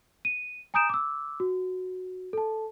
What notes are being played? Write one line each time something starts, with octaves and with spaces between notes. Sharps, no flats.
D#7
G#5 A#5 D#6 G6 D7 E7
D6 E6
F#4
A4 A5